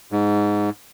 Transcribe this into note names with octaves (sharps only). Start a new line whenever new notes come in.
G#2